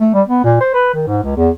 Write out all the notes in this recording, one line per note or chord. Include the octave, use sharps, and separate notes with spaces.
A3
G3
B3
A#2
C5
B4
D#3
G#2
C#2
E2